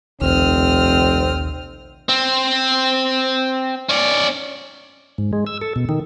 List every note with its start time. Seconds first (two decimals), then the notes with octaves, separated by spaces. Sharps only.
0.21 F1 A#1 D#2 C4 D#6 F6
2.09 C4
3.89 C#4 D5
5.18 G#2
5.33 G#3
5.47 E6
5.62 A4
5.76 B2
5.89 D#3